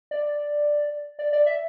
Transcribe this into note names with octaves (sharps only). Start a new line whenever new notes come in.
D5
D5
D5
E5